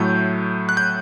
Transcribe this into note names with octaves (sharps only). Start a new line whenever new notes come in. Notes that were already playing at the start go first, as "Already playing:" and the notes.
Already playing: A2 F#3 A3 G6
F#6
G6